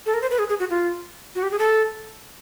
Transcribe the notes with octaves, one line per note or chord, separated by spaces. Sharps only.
A4
A#4
C5
B4
G#4
G#4
F#4
F4
F#4
G4
G#4
A4